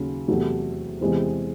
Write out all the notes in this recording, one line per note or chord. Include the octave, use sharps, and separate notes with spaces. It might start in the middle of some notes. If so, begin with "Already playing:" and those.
Already playing: D#2 C#3 F#3 C#4
E2 C3 F#3 A3
E2 C3 E3 G#3 C4